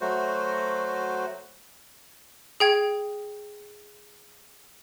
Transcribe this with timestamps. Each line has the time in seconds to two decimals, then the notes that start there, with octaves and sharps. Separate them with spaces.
0.01 F#3 A3 F#4 C5
2.60 G#4 G5 G#6